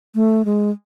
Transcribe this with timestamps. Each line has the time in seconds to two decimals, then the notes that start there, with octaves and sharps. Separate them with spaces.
0.15 A3
0.45 G#3